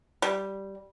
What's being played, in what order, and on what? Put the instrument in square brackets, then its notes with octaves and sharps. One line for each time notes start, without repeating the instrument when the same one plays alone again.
[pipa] G3